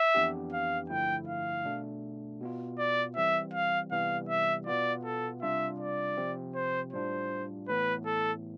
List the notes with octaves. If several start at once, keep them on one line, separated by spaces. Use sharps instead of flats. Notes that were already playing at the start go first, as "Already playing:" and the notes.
Already playing: E5
F2 E3 B3 D4 G4
F5
G2 D3 F3 A3 E4 G5
F5
B2 A3 D4
B2 B3 F4
D5
E3 G3 C4 E5
F5
C3 E3 G3 B3 F5
E5
B2 B3 F4 D5
A4
C3 G3 D4 F4 E5
D5
C3 F3 C4
C5
A2 G3 D4 F4 C5
A2 E3 B3 B4
A4